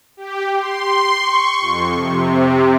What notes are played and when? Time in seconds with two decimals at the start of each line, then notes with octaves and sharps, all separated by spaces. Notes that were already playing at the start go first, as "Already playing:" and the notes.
0.17 G4
0.55 C6
1.17 C#6
1.61 F2
1.94 C3